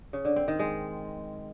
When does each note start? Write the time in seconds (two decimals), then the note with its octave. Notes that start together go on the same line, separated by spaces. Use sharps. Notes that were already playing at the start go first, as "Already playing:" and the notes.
0.13 C#3
0.25 D3
0.36 C4
0.48 D#3
0.59 G#3